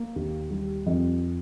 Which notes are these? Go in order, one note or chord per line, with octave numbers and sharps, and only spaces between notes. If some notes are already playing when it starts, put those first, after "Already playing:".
Already playing: A#3
D#2
G3
F2